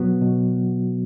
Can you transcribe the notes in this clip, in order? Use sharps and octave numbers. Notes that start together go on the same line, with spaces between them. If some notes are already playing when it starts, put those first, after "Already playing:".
Already playing: B2 F#3 B3 F#4
B2